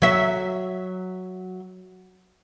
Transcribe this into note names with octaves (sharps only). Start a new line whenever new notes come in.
F#3 E5